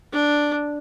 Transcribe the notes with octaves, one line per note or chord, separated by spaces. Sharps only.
D4